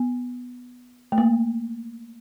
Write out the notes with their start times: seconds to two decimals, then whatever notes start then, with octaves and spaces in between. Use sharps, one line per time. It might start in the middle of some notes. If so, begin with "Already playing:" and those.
Already playing: B3
1.12 A3
1.18 A#3